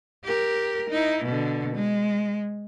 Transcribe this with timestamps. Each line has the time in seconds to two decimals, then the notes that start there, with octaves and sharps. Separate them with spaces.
0.24 G4 A#4
0.90 D#4 E4
1.24 B2 D3
1.76 G#3